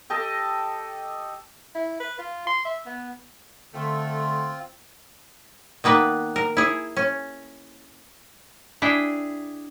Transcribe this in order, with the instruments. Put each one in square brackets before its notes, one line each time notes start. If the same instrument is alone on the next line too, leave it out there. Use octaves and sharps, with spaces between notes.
[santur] G4 A4 D#5 G5
[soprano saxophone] E4
B4
F4
C6
E5
B3
[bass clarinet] D3 [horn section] A3 [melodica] C4 F4
[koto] D#3 A#3 B3 B4
A#4
E4 G#4
C#4
D4 E4 G#4 G5